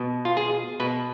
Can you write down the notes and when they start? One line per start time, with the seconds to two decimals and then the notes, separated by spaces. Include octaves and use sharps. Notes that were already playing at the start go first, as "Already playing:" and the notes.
Already playing: B2
0.25 F4
0.37 G#4
0.80 B2 B4